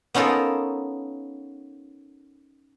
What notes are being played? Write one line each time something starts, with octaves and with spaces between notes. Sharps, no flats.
B3 C#4 D#4 F4 A4 A#4